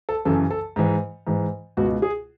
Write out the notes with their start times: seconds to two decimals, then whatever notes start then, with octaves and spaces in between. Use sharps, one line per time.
0.09 A4
0.25 F#2 C#3 E3 A4
0.51 A4
0.76 G#2 E3
1.27 G#2 E3
1.77 C#2 B2 F#4
2.02 G#4